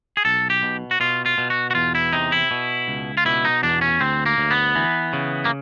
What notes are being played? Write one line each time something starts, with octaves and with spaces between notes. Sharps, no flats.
G#4
B1 A4
G4
B2
F#4
B2 F4
F4
B2
F#4
F#4
E2 F4
E4
C3 D#4
E4
B2
C#2
F4
B2 E4
D#4
E2 D4
C#4
D2 C4
A#3
D2
B3
E3
C#3
A#3